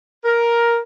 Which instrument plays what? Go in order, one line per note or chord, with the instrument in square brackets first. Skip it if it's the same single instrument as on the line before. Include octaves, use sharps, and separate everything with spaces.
[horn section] A#4